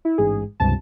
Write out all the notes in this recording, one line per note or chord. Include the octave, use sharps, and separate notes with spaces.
E4
A1 G#2 G#4
C#2 G2 C3 A5